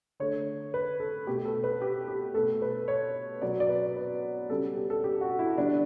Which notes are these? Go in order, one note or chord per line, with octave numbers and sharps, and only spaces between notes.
D3 A3 C#5
B4
A4
B2 A3 G4
A4
B4
G4
G4
B2 A3 A4
B4
C#5
B2 F#3 B3 D5
D5
B4
B4
C#3 G3 B3 A4
G4
A4
G4
F#4
E4
D3 G3 B3 D4